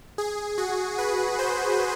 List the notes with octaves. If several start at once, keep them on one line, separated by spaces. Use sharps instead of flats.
G#4
F#4
B4
C5